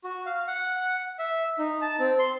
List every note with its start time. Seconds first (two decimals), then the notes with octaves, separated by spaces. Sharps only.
0.04 F#4
0.26 F5
0.48 F#5
1.19 E5
1.59 D#4
1.81 A5
1.99 C4
2.19 C6